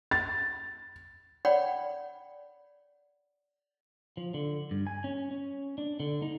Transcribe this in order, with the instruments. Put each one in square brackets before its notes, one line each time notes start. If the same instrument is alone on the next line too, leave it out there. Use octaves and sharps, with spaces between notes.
[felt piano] A6
[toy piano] C#5 D5 F#5 G5 B5
[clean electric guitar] F3
D3
G2
G#5
C#4
C#4
D4
D3
D#4